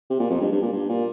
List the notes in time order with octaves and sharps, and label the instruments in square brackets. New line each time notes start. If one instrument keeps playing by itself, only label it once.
[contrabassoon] C3
A#2
F2
G2
G2
A#2
G2
A#2